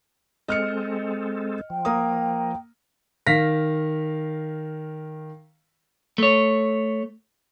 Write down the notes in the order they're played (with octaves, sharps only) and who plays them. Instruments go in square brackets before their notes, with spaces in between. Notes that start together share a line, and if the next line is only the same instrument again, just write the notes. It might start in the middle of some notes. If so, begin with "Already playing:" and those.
[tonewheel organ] G#3 C4 A4 [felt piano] D#5 F6 C#7
[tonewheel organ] F3 [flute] G5
[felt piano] A#3 A#5 D#6
[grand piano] D#3 F5 A#6 B6
[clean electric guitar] A3 C#5